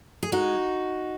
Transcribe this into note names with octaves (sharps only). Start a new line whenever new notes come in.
G#4
G#3 D#4 F#4